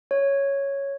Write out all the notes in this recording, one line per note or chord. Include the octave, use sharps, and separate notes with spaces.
C#5